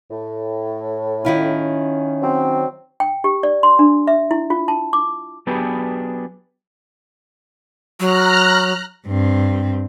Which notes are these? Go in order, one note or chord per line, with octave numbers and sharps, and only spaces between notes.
A2
D#3 C#4 E4 F4
F#3 C4
G5
G4
D5
C6
D4
E5
E4
F4
A5
D6
F#3 B3 D4 G4 G#4 B4
F#3 A#5 F6 F#6
G2 C4